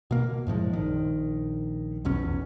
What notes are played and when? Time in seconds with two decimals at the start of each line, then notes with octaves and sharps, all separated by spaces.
0.11 B2 A#3
0.47 F#2 A2 F3 G#3
0.73 A#1 D#3
2.05 F1 B1 E2 C#4